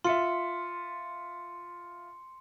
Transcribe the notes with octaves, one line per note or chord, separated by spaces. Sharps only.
F4 E5 C6 C#7